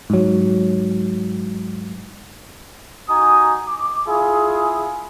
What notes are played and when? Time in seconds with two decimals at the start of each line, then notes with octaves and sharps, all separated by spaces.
0.10 G#2 F#3
3.09 D#4 F#4 G#5 A#5 D#6
3.68 D6
4.07 E4 F4 G#4